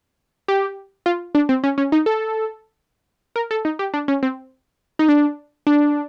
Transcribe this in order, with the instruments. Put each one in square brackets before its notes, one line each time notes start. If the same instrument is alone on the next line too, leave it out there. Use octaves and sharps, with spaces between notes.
[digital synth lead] G4
F4
D4
C4
C#4
C#4
D#4
A4
A#4
A4
D#4
G4
D4
C#4
C4
D#4
D4
D4